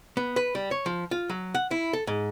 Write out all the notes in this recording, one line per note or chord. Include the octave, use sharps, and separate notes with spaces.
B3
B4
G3
C#5
F3
F4
F#3
F#5
E4
A4
G#2